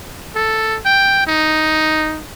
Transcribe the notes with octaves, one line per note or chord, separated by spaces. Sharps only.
A4
G5
D#4